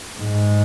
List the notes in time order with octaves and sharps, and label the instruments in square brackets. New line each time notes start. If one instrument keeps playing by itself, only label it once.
[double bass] G#2